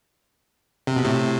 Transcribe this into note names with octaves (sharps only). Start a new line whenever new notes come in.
C3
B2
A2 C3